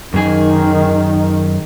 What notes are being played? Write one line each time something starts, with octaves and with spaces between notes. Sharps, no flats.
F#2 D#3 G#4 G#5